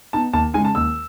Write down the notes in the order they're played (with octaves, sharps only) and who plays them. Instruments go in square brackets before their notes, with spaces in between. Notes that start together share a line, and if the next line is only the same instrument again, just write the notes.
[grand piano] B3 D#4 [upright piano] A5
[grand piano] D#2 [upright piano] A5
[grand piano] C#3 G#3 D#4 [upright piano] G#5
[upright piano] A5
[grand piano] D#2 [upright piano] E6